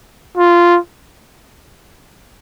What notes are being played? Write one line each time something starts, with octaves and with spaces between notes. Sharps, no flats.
F4